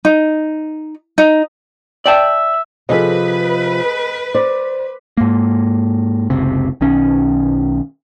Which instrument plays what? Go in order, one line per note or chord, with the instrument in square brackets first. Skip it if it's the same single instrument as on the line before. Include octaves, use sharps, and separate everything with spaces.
[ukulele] D#4
D#4
[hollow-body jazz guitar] D5 G5 A5 [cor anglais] E5
[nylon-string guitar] C3 F3 [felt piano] G#4 A4 D#5 [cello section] B4
[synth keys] C5 [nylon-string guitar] D5
[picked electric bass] G#2 A#3
F#1 C#2 C3
B1 D#3 C#4